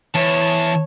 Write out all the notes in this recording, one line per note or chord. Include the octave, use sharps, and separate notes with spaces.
E2 C#5 A5